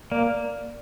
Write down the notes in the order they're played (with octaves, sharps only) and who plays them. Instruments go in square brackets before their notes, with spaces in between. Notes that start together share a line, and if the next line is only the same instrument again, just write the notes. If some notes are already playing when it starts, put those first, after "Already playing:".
[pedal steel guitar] A#3 [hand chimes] D5